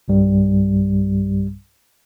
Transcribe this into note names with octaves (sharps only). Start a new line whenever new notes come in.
B1 G2 G3